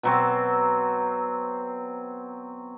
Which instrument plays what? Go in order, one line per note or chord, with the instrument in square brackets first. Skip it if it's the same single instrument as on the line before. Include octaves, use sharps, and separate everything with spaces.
[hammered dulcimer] B2 F#3 C4